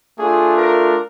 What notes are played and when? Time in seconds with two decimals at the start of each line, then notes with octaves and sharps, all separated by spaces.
0.18 A3 D4 F4 G#4
0.56 A#4